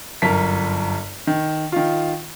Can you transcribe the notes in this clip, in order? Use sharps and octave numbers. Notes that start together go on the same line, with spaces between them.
G1 F#2 A#4 A5 B6
D#3
D#3 F4